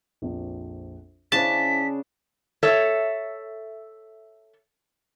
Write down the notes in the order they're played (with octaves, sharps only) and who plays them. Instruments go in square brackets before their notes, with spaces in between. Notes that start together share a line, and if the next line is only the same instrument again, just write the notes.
[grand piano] A#1 F2
[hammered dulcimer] C#3 D4 D6 [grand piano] E4 C5 [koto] A5 [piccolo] B6
[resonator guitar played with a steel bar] A4 C#5 E5